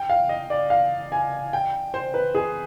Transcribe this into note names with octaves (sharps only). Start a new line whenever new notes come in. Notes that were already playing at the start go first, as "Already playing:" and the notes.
Already playing: G5
F5
D#5
D5
F5
G#5
G5
C5
B4
G#4